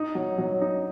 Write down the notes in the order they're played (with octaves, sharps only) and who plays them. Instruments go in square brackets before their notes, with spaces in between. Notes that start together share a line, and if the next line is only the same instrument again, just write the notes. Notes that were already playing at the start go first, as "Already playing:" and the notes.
Already playing: [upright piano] D#4
F#3
F#3
D#4